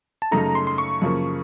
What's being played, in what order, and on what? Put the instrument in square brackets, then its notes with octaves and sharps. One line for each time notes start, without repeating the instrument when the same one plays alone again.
[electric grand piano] A5
[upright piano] F#2 C#3 A3 D#4 A4 [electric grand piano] A#5
[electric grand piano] C6
C6
C#6
[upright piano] F#2 C#3 F3 A#3